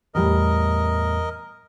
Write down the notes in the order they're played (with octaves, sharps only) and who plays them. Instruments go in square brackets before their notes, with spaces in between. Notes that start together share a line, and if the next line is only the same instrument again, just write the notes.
[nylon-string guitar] E2 A2 G3 [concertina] A#4 D#5